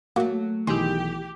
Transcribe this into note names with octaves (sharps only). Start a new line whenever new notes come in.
F#3 A3 A#3 F#4
B1 D#3 E3 G4 G#4 C6 E6